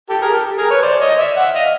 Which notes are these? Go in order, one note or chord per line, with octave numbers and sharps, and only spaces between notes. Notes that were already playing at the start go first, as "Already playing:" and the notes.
G4 A4
G#4 A#4
G4 A4
G#4 A#4
B4 C#5
C5 D5
C#5 D#5
D5 E5
E5 F#5
D#5 F5